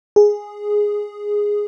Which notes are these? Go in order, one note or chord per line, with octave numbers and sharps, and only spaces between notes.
G#4